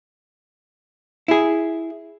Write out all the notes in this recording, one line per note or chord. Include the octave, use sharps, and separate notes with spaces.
E4 G#4